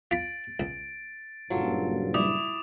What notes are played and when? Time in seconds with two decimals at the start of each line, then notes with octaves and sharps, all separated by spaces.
0.11 F4 B5 A6 D7
0.60 C#2
1.50 F#1 G2 A#2 F#3 F4 A4
2.14 G3 E4 D6 D#6